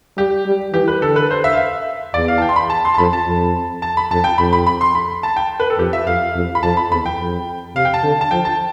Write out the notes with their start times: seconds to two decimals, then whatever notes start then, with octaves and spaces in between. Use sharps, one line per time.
0.17 G3 G4
0.46 G3
0.73 E3 G4
0.88 B4
1.02 D3 A4
1.16 B4
1.31 C5
1.44 E5
1.53 F5
1.57 E5
2.14 E2 D5
2.28 F5
2.38 A5
2.42 G5
2.49 C6
2.56 B5
2.70 A5
2.85 C6
2.94 A5
2.98 F2 B5
3.13 A5
3.27 F2
3.82 A5
3.97 B5
4.11 F2 A5
4.24 G5
4.38 F2 B5
4.53 B5
4.67 B5
4.81 C6
4.95 B5
5.23 A5
5.36 G5
5.60 B4
5.70 A4
5.78 F2 G4
5.93 E5
6.07 F2 F5
6.35 F2
6.55 B5
6.63 F2 A5
6.77 B5
6.91 E2 B5
7.06 G5
7.19 F2
7.75 C3 F5
7.85 G5
7.94 A5
8.03 D3
8.21 A5
8.31 F3 G5
8.45 A5